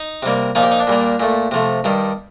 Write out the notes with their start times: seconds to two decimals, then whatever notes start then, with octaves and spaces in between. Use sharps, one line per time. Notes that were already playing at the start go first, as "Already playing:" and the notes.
Already playing: D#4
0.23 C3 G3 A#3
0.55 A#2 F3 A#3 D#4
0.63 G4
0.71 D#4
0.80 D4
0.87 A#2 G3 A#3
1.20 A#2 A3
1.51 C3 F3 A3
1.84 G2 D#3 G3